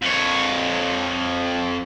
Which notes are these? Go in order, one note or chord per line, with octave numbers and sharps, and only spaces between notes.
F2 C#5